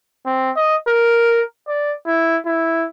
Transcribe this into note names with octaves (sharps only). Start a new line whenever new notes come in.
C4
D#5
A#4
D5
E4
E4